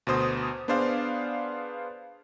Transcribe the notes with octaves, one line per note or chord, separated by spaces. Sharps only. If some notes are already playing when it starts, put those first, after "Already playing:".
D2 B2 C5 D#6
B3 D4 G#4 C5 D5 F5